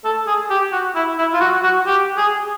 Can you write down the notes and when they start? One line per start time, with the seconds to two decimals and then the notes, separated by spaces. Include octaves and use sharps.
0.04 A4
0.27 G#4
0.50 G4
0.72 F#4
0.95 E4
1.18 E4
1.33 F4
1.41 F#4
1.63 F#4
1.87 G4
2.17 G#4